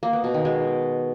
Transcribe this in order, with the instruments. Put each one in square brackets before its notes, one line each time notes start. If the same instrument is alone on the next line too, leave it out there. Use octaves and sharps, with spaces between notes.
[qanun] A#3
B3
B2
D#3
G#3